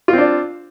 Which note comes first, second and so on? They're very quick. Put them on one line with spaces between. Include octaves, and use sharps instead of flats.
F4 C4 D4